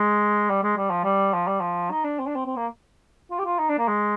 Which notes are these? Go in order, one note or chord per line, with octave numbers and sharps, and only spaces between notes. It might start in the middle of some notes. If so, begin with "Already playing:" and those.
Already playing: G#3
G3
G#3
G3
F3
G3
F3
G3
F3
D#4
D4
C4
D4
C4
C4
A#3
F4
G4
F4
D#4
D4
A#3
G#3